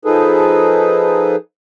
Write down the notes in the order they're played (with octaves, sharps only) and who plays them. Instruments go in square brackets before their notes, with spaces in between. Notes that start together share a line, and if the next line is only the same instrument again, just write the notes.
[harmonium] F3 D#4 G#4 A4 B4